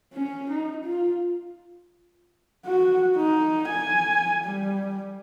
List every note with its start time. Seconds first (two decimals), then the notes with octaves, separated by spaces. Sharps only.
0.13 C#4
0.50 D#4
0.84 F4
2.65 F#4
3.16 D#4
3.69 G#5
4.45 G3